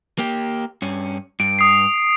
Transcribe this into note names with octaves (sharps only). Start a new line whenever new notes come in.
A#3 G4
G2 C#4
G2 D7
D#6 C7